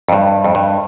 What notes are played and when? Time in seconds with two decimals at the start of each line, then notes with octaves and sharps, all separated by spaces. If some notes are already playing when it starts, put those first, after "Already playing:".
0.08 F2
0.13 G2
0.44 F2
0.55 G2